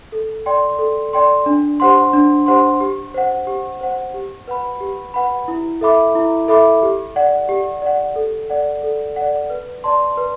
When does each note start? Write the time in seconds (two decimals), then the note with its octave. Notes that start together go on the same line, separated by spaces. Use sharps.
0.12 A4
0.46 D5 G5 C6
0.79 A4
1.13 D5 G5 C6
1.46 D4
1.80 G4 C5 F#5 C6
2.13 D4
2.46 G4 C5 F#5 C6
2.80 G4
3.14 C5 F#5
3.47 G4
3.81 C5 F#5
4.14 G4
4.48 B4 F#5 B5
4.81 G4
5.14 B4 F#5 B5
5.48 E4
5.81 A4 E5 B5 D6
6.15 E4
6.48 A4 E5 B5 D6
6.83 G4
7.16 D5 F#5
7.49 G4
7.82 D5 F#5
8.16 A4
8.50 D5 F#5
8.84 A4
9.16 D5 F#5
9.50 B4
9.84 D5 A5 C6
10.18 B4